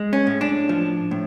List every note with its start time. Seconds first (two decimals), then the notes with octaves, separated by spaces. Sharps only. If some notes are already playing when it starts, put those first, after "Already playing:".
Already playing: G#3
0.13 C#4
0.27 A2
0.41 D4
0.69 F3
1.11 A2